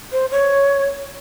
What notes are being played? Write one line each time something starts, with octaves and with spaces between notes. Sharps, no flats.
C5
C#5